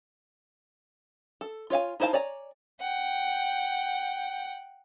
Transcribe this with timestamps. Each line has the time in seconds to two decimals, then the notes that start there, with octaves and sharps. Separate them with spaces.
1.41 A4
1.70 F4 C#5 F5 G#5
2.00 D#4 E4 C5 F5 A5
2.13 C#5 D5 G#5 A#5
2.80 F#5 G5